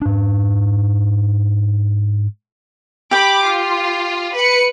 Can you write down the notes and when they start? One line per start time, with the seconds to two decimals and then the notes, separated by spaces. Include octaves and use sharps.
0.02 G#2 D4
3.11 G4 G5 B5 D6
3.43 F4
4.34 B4 C#7